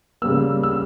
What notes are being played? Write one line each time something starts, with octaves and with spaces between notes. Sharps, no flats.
C#3 G3 A#3 E6
E6